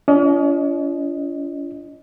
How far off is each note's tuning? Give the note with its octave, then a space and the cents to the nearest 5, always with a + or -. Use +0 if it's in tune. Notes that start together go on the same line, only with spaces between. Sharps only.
C#4 +45 F4 -40 D#5 +0